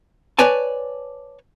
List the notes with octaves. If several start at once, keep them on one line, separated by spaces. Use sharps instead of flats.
B4 C#5 D5 G#5 A5